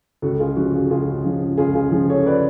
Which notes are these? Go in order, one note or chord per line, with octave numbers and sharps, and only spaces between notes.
C#2 F#4 A4
F4 G#4
C#3 F3 F#4
F#4
C#2 F4 G#4
C#3 F3
C#2 F4 G#4
F4 G#4
C#3 F3
A4 C#5
B4 D5